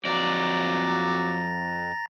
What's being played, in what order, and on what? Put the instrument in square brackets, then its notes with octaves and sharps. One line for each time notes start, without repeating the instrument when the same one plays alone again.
[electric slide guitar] F2 D5 [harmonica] F#3 D6 [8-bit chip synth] A#5 A6 A#6